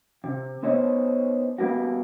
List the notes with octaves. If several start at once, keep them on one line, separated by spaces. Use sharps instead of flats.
C3
B3 D#4 C5 C#5 D#5
G3 A#3 B3 F#4